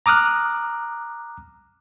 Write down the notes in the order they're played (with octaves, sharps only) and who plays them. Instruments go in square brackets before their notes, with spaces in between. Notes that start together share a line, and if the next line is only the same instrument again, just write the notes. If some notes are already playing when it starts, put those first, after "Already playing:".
[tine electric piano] A#5 D6 D#6 F6 F#6